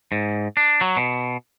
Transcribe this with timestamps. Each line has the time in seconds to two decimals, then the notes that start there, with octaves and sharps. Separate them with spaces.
0.12 G#2
0.57 D4
0.81 F#3
0.97 B2